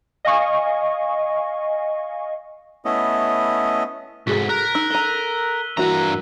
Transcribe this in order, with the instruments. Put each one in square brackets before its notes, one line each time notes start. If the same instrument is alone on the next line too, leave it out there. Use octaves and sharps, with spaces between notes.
[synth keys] D#5 F5 G#5 C#6
[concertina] A3 B3 C#4 E4 D#5
[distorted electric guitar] C2 G#2 [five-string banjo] F#4 G#4 A4 [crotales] B6
[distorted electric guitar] A#4 [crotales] F#6
[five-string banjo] D#4 [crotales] E6
[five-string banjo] A4 A#5 [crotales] D#7 G7
[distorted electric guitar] G2 A#5 [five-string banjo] E3 A#3 F#4